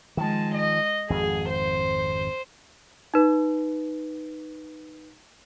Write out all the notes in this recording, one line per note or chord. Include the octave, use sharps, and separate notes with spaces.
D#3 F3 G#3 A5
D#5
G#1 F2 G#4
C5
D#4 B4